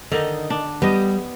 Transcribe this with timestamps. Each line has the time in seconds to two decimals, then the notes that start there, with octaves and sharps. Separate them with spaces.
0.12 D3 D#3 D#4 D#5
0.50 D4
0.82 G3 B3 G4 D#5